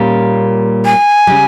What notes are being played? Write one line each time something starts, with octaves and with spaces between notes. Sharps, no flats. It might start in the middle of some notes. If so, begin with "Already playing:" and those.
Already playing: A#2 G3 A#3 C#4
G#5
C#3 G3